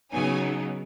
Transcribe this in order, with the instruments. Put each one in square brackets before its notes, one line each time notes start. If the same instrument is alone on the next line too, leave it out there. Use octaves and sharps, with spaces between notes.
[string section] C#3 F#3 B3 D#4 G#5